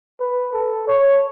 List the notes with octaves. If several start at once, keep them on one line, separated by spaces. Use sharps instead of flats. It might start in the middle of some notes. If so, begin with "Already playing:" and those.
B4
A4
C#5